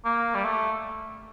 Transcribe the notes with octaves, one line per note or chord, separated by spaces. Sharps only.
A#3
G3
A3